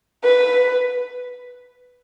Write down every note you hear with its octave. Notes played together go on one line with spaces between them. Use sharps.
B4